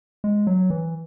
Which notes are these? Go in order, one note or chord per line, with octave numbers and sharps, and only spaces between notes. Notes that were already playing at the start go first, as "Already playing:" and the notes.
G#3
F#3
E3